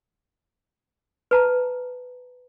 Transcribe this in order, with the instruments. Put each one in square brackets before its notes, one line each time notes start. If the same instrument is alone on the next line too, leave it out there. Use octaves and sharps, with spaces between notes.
[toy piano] B4 A5 A#5